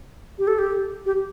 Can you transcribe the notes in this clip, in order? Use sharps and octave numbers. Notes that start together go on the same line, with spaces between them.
G4
A4
G4
G4